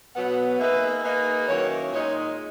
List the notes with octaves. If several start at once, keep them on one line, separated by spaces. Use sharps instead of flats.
B2 F#3 B3 F#5
A#3 D#4 G#4 B4 E5
A#3 D#4 G#4 B4
D#3 F#3 A#3 C#4 E4 C#5
A#2 G#3 D#4 C#5